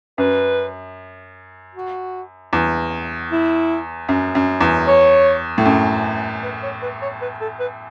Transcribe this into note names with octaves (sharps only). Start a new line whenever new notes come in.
F#2 B4
F#4
E2
E4
F#2
F#2
E2
C#5
A2
F#2
B4
C#5
B4
C#5
B4
A4
B4